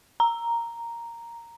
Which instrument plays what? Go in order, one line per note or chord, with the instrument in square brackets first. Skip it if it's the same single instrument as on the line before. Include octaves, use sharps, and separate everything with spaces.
[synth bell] A#5